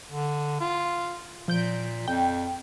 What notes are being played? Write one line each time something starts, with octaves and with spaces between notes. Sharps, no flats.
D3
F4
A#2 F3 G6 D7
F2 G5